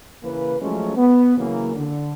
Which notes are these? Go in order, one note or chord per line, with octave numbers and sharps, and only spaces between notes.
C#3 E3 A#3 B4
F3 F#3 G#3 A3 C#4
B3
C#3 E3 F#3 A#3
D3